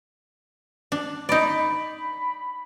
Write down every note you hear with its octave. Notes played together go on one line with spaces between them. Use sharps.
D4
D#4 D5 B5